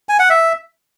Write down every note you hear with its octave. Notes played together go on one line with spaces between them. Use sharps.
G#5
F#5
E5